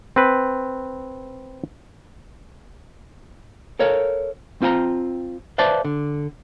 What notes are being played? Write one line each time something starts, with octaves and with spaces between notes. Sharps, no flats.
C4 B4
A4 A#4 C#5 F5
C4 F4 G5 G#5 A#5
B4 C5 D5 E5 F5 A5
D3